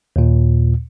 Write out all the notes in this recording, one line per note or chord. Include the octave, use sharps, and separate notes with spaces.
D#2 A#2